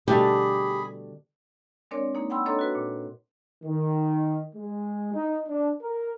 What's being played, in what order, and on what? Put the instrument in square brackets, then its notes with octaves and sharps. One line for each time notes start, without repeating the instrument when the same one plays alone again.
[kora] B2 G3 A3 [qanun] D3 [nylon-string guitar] G4 [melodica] G#4 B5
[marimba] G#3 C4 D4 A#4 C#5 D5
A#3 D#4
F#5 G5 B5 C6 E6
D4 A4 C#5 D#5 A#5 C6
F#4 B4
A#2
[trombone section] D#3
G#3
D#4
D4
A#4